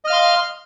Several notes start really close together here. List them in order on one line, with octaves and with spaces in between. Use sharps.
D#5 F6 F5 C6